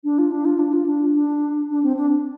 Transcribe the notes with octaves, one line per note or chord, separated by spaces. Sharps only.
D4
F4
D4
F4
D4
F4
D4
D4
D4
C4
D4